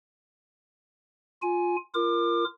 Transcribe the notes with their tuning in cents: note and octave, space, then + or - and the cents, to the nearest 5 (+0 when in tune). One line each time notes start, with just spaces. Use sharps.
F4 +10 G#5 +10
F4 -25 A#4 +0 D6 +30